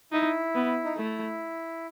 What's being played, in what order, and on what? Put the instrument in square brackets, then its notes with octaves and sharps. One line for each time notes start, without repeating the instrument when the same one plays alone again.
[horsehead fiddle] D#4 [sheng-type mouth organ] E4
[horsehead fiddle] B3
[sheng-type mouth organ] D#4
[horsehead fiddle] A3 [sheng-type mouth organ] E4